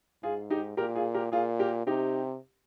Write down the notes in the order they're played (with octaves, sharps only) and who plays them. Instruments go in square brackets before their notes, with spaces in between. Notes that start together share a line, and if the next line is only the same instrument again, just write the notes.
[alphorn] G#2 [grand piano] F4 G#4
[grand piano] D#4 G4
[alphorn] A#2 [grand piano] G4 A#4
[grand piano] F4 G#4
G4 A#4
[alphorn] A#2 [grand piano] F4 G#4
[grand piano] G4 A#4
[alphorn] C3 [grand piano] D#4 G4